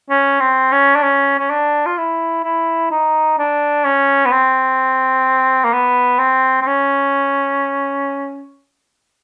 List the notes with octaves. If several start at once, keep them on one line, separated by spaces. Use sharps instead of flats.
C#4
C4
C#4
D4
C#4
C#4
D4
F4
E4
E4
D#4
D4
C#4
B3
C4
A#3
B3
C4
C4
C#4